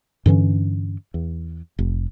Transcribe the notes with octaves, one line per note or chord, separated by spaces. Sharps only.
G2 D3 E3 C#4
E2
F1